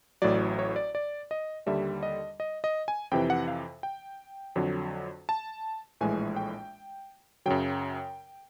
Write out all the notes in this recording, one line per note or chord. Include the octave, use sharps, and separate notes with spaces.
A1 A2 F#3 D5
C#5
D5
D5
D#5
D#2 D3 G3 E5
D#5
D#5
D#5
G#5
F2 C3 E3 G5
F#5
F5
G5
F2 D3 F#3
A5
A#1 A2 E3 G#3 G#5
G5
F#2 C#3 F#3 G5